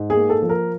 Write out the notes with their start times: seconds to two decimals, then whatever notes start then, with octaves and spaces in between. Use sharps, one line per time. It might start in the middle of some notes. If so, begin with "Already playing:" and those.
Already playing: G#2
0.10 G#4
0.16 A#3
0.30 A4
0.42 F3
0.49 A#4